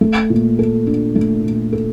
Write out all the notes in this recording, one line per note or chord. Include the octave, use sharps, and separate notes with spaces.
A3
A#2
A4
D4
A3
A#2
A4